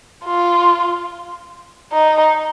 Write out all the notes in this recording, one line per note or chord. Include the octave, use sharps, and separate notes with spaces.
F4
D#4